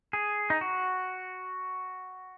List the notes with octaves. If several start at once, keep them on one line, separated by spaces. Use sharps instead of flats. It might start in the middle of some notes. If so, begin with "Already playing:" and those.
G#4
D#4
F#4